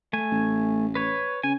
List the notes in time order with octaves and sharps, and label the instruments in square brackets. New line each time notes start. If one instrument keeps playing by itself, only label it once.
[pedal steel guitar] A3 G#5
[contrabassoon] A1
[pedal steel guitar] B4 C#5
[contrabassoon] C#3 [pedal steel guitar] G#5